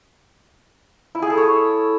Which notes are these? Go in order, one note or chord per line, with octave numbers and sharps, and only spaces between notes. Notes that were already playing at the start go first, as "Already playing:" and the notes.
E4
G#4
A4
C#5